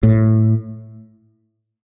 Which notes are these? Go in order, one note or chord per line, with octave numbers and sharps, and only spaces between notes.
A2